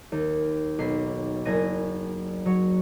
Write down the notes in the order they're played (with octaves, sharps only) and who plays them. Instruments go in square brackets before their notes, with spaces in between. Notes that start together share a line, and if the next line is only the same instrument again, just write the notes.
[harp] D#2
B1 B6 C7
F#1 G#5 A#6 D#7
F#3 C#5